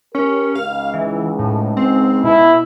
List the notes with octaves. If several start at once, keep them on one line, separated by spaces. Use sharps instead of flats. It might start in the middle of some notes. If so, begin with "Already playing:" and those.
C#4 G4 A#4
C#2 G#2 F5
E3
A2
C4
B2 E4